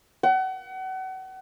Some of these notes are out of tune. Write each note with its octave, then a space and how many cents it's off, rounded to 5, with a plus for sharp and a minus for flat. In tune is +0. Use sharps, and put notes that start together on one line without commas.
F#5 +35